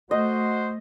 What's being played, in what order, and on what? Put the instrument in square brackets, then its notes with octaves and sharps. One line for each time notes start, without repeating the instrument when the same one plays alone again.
[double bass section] A3 [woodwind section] F#4 C5 [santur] D#5